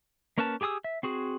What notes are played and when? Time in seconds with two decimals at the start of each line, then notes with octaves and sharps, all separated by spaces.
0.38 A#3 C#4 A#4 B4 A5
0.61 G4 G#4 G#5 D#6 E6
0.84 E5
1.03 C4 F#4 G#4